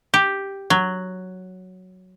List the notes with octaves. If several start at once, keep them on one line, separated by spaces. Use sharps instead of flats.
G4
F#3